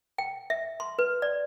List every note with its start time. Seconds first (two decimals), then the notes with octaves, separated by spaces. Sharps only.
0.18 G5
0.50 E5
0.80 C6
0.99 B4
1.22 D5